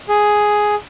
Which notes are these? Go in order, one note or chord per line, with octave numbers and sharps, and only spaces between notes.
G#4